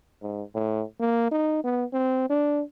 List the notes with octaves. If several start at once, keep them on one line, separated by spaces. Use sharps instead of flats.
G#2
A2
A#3
D#4
B3
C4
D4